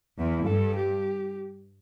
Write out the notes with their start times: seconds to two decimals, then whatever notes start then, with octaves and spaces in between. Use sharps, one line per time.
0.18 E2 E4
0.46 G2 A4
0.76 G4